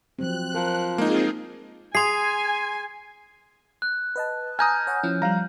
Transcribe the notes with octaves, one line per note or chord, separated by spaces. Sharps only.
F3 F#3 C4 F#6
F3 A#4
G#3 A#3 C4 D#4 F4 G#4
G#4 G#5 C6 C7
F#6
B4 D#5 A5
G#5 A#5 D#6 F6 G6
C#5 F#5
F3 C#4 E4
F3 G3 F5 A#5